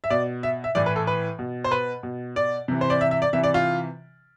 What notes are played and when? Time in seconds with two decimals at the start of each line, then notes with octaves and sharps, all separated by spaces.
0.04 E5
0.10 B2 D5
0.43 E5
0.64 E5
0.75 A2 E3 D5
0.86 B4
0.96 A4
1.07 B4
1.39 B2
1.64 C5
1.71 B4
2.03 B2
2.36 D5
2.68 C3 E3
2.81 C5
2.90 D5
3.01 E5
3.11 E5
3.22 D5
3.33 C3 E3 E5
3.44 D5
3.54 F4